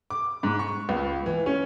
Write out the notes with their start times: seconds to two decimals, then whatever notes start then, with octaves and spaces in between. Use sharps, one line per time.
0.10 D6
0.43 G#2
0.59 C#6
0.89 C#2
1.26 E3
1.46 C#4